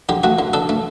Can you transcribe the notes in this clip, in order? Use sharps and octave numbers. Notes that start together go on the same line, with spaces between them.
D3 G4
A3 F#4
D3
D4 A4
A3